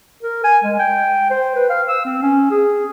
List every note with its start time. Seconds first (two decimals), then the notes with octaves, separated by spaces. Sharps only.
0.23 A#4
0.44 G#5
0.64 G#3
0.79 G5
1.31 C5
1.56 B4
1.70 F5
1.88 E6
2.06 C4
2.22 C#4
2.51 G#4